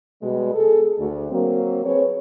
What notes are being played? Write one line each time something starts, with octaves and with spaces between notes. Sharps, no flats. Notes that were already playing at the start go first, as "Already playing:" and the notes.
B2 G3 G#3
G#4 A4
D2
F#3 A#3 C4
C4 G#4 B4 C#5